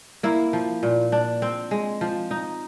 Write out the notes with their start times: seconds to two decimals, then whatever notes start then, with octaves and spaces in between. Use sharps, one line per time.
0.23 A#3 E4
0.53 F3
0.83 A#2
1.12 D4
1.42 C4
1.71 G#3
2.01 F3
2.31 D#4